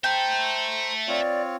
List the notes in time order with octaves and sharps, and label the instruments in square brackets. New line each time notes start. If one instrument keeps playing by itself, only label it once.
[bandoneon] C5 A#5 [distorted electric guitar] E5 A5 [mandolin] G5
[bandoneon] C4 F4 C#5 [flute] D5